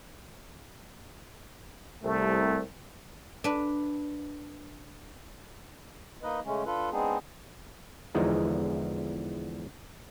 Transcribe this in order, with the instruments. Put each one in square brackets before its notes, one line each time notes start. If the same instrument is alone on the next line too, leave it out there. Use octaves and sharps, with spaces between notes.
[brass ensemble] C2 [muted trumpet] A3
[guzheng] D4 B4
[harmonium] A#3 D#4 B4 D#5
C#3 G#3 A3 C#4
D4 F4 A4 B4
G#3 B3 C4 D4 D#4 G#4
[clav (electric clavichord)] E2 D3 E3 F3 G#3 D#4